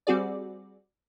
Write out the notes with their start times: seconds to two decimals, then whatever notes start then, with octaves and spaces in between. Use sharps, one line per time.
0.07 G3 C4 F#4 G#4 D5